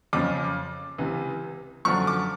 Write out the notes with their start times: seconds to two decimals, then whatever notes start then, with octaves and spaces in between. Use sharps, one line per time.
0.13 F2 C#3 F3 D6
0.98 C#2 C3 E3
1.85 F#2 D3 F3 C#6
2.07 D6